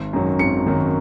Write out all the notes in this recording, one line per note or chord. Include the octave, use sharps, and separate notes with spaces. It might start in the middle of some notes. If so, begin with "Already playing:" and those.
Already playing: G#1
F#2 D#3 F#3
G#1 C#7
F#2 D#3 F#3